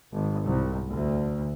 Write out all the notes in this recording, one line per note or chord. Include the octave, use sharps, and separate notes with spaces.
G#1
C2
D2